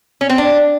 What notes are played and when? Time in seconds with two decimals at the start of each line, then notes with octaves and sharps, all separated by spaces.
0.21 C#4
0.30 C4
0.38 D4